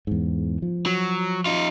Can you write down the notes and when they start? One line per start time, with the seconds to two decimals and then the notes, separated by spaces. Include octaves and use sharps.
0.07 E2 G#2
0.62 F3
0.86 F#3
1.46 D#4 F4